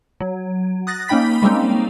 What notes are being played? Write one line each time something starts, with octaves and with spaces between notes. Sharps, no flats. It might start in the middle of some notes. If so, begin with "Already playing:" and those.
F#3
D#6 F#6 A6 A#6
A#3 C#4 D#4 G5 B5 B6
G3 G#3 A#3 C4 C#4 D#4